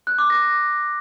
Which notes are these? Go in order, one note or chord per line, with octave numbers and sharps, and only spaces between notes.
F#6
D6
A#6